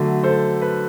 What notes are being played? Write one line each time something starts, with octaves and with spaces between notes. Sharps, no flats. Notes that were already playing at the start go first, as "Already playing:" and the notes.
Already playing: D3 F#3 A3
A4 C5
B4